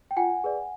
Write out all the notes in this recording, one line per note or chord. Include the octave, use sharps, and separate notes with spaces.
G5
F4 F#5 G#5
G#4 B4 D5